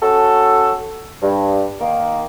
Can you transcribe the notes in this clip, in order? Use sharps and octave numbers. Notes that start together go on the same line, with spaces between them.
C#4 F#4 A4
G2
D#3 A#3